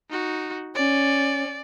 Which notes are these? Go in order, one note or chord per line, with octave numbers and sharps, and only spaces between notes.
D#4 F#4
C#4 D5